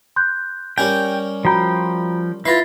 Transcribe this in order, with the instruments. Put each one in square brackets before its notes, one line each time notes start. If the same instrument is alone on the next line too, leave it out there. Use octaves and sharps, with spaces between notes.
[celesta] C6 F#6 G6
[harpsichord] G3 C#4 A#4 [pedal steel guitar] G5 [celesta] G#5
[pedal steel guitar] F3 G5 [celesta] F#4 A#5 B5
[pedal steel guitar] E4 [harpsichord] F4 B4 [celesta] A6 A#6 C7